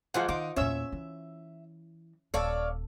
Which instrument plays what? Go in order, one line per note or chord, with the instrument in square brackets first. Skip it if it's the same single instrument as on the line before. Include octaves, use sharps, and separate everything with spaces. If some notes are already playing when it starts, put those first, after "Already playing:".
[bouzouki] E3 F#3 G#3 [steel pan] F4 C5 F#5
[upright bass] D#3 [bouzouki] D#4 [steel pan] D6
[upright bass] E2 A#2 [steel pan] C#4 C#5 E6 [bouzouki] E5
[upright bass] E3
[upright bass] D#1 [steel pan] A4 [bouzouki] C#5 D5 F5